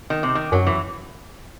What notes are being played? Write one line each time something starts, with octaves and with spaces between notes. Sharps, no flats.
D#3
C3
D#3
F#2 F#3
E3